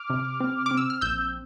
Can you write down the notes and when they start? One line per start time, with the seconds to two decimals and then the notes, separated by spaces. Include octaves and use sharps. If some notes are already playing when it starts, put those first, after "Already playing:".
Already playing: D6 F6
0.10 C3
0.40 C4
0.66 C4 D6
0.77 E6
0.90 F6
1.01 A#1 E6 G6